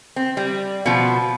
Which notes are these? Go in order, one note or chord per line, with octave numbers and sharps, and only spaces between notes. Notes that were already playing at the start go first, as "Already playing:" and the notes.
C4
G3
B2 F3